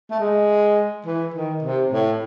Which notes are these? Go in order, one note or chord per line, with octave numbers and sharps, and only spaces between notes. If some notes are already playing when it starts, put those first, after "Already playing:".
A3
G#3
E3
D#3
C3
A2